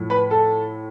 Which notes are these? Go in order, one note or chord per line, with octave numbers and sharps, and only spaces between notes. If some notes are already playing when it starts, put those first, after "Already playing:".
Already playing: A2 F3
B4 B5
A4 A5